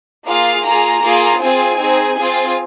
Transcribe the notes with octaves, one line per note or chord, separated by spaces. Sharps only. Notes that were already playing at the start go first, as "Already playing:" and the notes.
A#3 F4 G#4 F5
A#3 F4 G#4 A#5
A#3 F4 G#4
C4 F4 G#4 G#5
C4 D#4 G#4
C4 F4 G#4